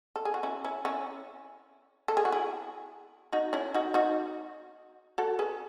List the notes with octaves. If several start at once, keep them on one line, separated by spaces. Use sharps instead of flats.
A4
G#4
F#4
C#4 E4
C#4 E4
C#4 E4
A4
G#4
F#4
E4 G#4
D#4 F#4
C#4 E4
D#4 F#4
D#4 F#4
F#4 A4
G#4 B4